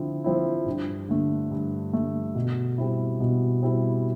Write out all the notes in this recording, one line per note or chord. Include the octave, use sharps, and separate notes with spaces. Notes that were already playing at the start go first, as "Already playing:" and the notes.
Already playing: D3 F3 C4 E4
F3 C4 E4
G2
D3 A3
G2
D3 A3
B2
G3 C4 E4
B2
G3 C4 E4